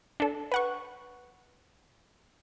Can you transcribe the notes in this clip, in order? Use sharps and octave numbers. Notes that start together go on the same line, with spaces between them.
D4 A4
B4 F#5 C#6